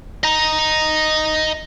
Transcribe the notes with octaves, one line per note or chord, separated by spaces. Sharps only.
D#5 A#5